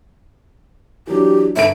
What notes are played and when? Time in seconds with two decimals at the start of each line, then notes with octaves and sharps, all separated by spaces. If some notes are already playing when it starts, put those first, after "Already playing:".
1.07 E3 F#3 D4 G4
1.56 G1 A4 E5 D7